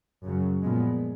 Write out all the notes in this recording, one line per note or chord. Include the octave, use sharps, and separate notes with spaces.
F#2 C#3 F#3
A#2 F3 G#3 B3